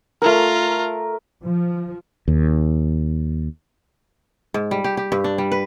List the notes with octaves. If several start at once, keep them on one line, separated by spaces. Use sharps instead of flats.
A3 F4 A#4 A#5
F3
D#2
G#2
G3
G4
G4
G2
D4
G3
B4